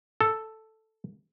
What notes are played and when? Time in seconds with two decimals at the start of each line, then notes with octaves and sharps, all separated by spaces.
0.21 A4